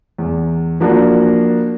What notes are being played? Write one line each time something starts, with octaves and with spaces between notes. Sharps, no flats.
E2
F3 A#3 D4 F#4